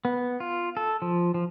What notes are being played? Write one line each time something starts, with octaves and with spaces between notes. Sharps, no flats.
B3
F4
A4
F3
F3